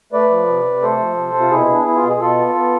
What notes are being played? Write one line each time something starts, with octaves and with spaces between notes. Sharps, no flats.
A3 B4 D5
F3
C3
C3
A3 A4 C5
F3
C3
C3
F4
B2 E4 G#4
B3 D4
B3 E4
F4
B2
G#4
B2 F4 A4
B3
B3